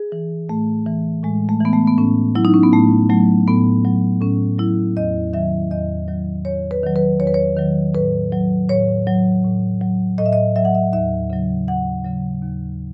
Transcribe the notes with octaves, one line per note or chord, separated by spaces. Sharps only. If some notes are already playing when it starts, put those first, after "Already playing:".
Already playing: G#4
E3
A2 A3
E3
A2 G#3
A3
E3 B3
A3
B3
A2 C#4
F#3 E4
D#4
C#4
B3
A2 A3
F#3 A3
A2 B3
F#3
A2 C#4
F#3 E4
E2 D#5
D#3 F#3 E5
E2 D#5
D#3 F#3
E2 C#5
B4
D#3 F#3
B4
E2 C#5
B4
C#5
D#3 F#3
A2 B4
F#3
A2 C#5
F#3
A2
F#3
A2 D#5
E5
D#5
F#3 E5
F#5
E5
D#2 E5
C#3 F#3
D#2 F#5
C#3 F#3
D#2